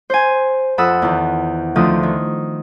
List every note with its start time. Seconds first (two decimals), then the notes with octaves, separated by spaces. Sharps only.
0.10 C5 G#5
0.78 F2 A4 F#5 B5 D#6 E6
1.02 E2 D#3
1.76 D2 D3 D#3 F3 D#6
2.03 D#3